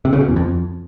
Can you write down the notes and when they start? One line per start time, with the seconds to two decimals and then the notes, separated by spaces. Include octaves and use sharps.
0.05 C3
0.13 C#3
0.21 B2
0.28 E2
0.36 F2